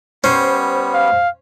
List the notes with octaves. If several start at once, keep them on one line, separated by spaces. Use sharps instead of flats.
G3 B3 C#4 C5
F5